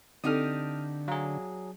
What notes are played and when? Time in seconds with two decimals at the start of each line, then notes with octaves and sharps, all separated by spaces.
0.24 D3 C4 D4 D#4 G4 A4 D#6 F6
1.08 F#3 G#4 F5 A#5